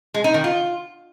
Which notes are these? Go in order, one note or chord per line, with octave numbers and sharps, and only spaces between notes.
G#3
D#4
D#3
F4